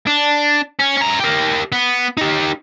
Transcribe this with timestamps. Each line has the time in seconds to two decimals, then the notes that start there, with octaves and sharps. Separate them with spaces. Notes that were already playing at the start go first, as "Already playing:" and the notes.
0.07 D4
0.80 C#4
0.98 C#4 A#5
1.20 G4 A#4
1.72 B3
2.17 D#4 G4